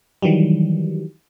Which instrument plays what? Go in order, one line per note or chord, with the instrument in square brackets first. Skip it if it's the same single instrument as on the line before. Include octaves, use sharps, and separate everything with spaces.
[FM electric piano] D#3 E3 F#3 G3